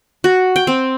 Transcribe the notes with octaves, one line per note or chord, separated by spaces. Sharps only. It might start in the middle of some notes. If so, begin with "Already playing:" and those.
F#4
G5
C4